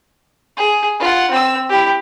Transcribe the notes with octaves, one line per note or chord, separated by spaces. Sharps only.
G#4
F4 F#5
C4 E6
E4 G4